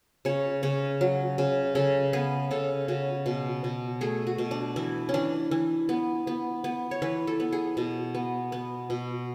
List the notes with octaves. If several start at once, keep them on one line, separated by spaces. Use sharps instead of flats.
C#3 C#5
C#3 C#5
F#3
C#3
C#3 A4
B3 G#4
C#3 A4
C#3 F#4
B2
B2
A3 G#4
F#4
B2
D4
E3 E4
C#4
E3 D4
E3
B3
B3
B3
C#5
E3 B4
A4
B3
G#4
B2
B3
B3
B2